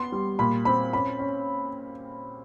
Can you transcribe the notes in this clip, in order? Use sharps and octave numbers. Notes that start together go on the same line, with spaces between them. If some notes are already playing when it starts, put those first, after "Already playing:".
Already playing: B3 C6
G3
A#2 B5
C4 B5
C#4 B5
C#4